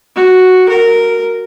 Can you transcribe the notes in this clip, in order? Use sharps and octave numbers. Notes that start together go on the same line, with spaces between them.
F#4
A#4